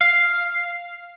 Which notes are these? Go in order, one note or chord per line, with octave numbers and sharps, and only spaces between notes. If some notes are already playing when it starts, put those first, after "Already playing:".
F5